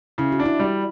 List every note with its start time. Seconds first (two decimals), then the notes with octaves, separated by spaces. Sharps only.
0.18 C#3 E4
0.32 F#4
0.39 D4
0.46 E4
0.60 G3